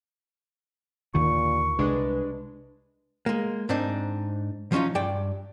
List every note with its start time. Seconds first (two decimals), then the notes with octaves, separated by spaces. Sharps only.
1.14 D#2 A#2 D3 D#3 C#6
1.79 C2 G#3 D4 B4
3.26 G#3 A#3
3.69 G#2 C4 D4 D#4
4.72 F3 F#3 C#4 D#4 F4
4.95 G2 D5 G5